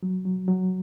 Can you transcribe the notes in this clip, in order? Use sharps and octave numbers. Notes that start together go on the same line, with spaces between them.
F#3
F#3
F#3